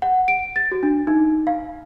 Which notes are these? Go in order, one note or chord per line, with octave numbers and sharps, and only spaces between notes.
F#5
D7
A6
F#4
D4
D#4
F5